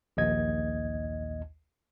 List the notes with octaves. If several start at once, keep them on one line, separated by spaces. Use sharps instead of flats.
A#1 D#2 D#5 G#6